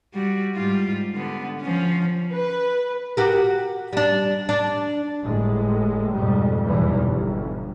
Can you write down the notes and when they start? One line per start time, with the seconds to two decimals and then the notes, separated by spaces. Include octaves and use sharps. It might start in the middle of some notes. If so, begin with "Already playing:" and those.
0.14 G3 F#4
0.55 G#2 G3 F4
1.15 D3 B3
1.62 F3 C#4
2.32 B4
3.17 F#4 G4 A#4
3.93 G3 D4
4.49 D4
5.24 G1 A2 G#3
6.14 F2 G#2 B2 G3
6.65 F1 B1 E2 E3 G3
7.01 G1